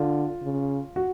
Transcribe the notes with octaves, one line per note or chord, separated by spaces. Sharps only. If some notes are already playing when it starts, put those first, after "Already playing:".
Already playing: D3 F4
C#3
F#4